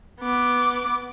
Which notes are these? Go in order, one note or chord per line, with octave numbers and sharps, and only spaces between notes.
B3 D6